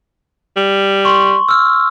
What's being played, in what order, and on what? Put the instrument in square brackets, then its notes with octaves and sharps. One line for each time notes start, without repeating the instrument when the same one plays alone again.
[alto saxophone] G3
[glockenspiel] C6 C#6
E6 F6